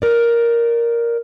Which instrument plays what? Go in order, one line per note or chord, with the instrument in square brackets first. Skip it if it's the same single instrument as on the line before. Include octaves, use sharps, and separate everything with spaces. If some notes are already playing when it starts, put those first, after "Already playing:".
[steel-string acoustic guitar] A#4 D5